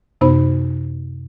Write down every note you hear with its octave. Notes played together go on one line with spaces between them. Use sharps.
F#2 C3 B3 D#4 C5 B5